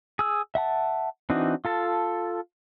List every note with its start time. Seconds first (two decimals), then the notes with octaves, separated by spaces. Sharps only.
0.19 G#4 E6
0.55 E5 F#5 A5
1.30 E3 C4 D4 D#4 F#4
1.65 F4 A4 A5